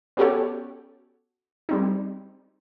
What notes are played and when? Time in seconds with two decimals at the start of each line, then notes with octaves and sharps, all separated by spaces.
0.17 B3 C#4 F#4 G4 A4 C#5
1.69 G3 C4 D#4